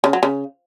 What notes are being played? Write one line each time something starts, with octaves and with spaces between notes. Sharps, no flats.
C#3
F#3
C#3